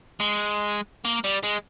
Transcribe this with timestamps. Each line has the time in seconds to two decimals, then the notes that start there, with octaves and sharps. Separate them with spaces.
0.20 G#3
1.05 A#3
1.24 G3
1.44 G#3